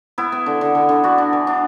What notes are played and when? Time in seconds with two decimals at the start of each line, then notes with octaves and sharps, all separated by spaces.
0.18 B3 E4
0.32 B3
0.46 D3
0.61 D3
0.75 D3
0.89 D3
1.04 D4 F#4
1.18 D4
1.33 E3
1.47 D4